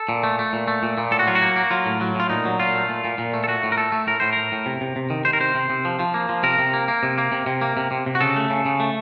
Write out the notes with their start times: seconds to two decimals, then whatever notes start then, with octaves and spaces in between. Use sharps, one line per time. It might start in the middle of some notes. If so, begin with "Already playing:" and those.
Already playing: A4
0.09 A#2
0.23 A3
0.39 A3
0.53 A#2
0.68 A3
0.83 A#2
0.98 A#2
1.11 A2 A4
1.19 F#4
1.27 F#3 F4
1.35 F#4
1.42 A#3
1.56 A#3
1.71 F#3 F4
1.86 A2
2.01 F#3
2.15 A2 F4
2.30 A#2 D#4
2.45 F#3
2.60 A#2 F4
2.75 A3
2.89 A#2
3.05 A#2
3.18 A#2
3.34 A3
3.44 A4
3.48 A3 F#4
3.63 A2
3.72 A#4
3.77 A3 A4
3.92 A3
4.07 A2 A#4
4.20 A2 C5
4.33 A2 A#4
4.52 A2
4.66 C3
4.81 C3
4.96 C3
5.10 D#3
5.25 D#3 C5
5.33 A#4
5.40 C3 C5
5.55 C3
5.70 C3
5.85 F3
5.99 F3
6.14 A#3
6.29 F3
6.43 C3 A#4
6.59 C3
6.73 A#3
6.88 A#3
7.03 C3
7.18 A#3
7.32 C3
7.46 C3
7.61 A#3
7.77 C3
7.91 C3
8.06 C3
8.15 F#4
8.20 C#3 A4
8.36 A3
8.50 C#3
8.65 C#3
8.80 A3